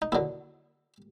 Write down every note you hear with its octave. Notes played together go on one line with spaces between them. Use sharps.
D#4
D#2 D3 F#3 E4